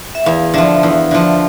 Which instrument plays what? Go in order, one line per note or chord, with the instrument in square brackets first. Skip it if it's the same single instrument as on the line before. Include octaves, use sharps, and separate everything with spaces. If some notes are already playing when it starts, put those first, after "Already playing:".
[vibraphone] E5
[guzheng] E2 [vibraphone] F5
[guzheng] D3 F3 [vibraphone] E5
[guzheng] E2
D3 F3